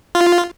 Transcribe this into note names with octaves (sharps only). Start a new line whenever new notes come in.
F4